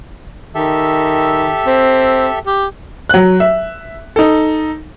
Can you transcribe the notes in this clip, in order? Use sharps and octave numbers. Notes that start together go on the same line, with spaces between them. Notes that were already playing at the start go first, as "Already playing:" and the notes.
D#3 G4 A4 E5
C4
G4
F#3 F#6
E5
D#4 A4